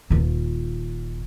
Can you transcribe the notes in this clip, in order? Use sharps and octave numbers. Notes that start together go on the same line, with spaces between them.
D#1 F4